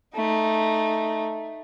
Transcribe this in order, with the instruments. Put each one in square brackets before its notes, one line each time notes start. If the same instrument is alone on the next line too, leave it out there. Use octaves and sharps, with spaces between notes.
[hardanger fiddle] A3 D#4